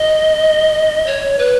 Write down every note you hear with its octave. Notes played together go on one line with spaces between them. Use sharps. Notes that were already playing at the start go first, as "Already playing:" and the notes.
Already playing: D#5
C#5
B4